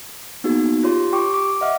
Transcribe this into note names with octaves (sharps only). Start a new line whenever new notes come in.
A#3 B3 D#4 F#4 G#4
F4 G4 C#5 C6
G4 G5 C#6 D6
D6
D#5 E5 F#5 F6